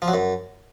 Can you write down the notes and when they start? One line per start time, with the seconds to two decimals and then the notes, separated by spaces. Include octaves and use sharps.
0.02 F3
0.08 F#3
0.14 F#2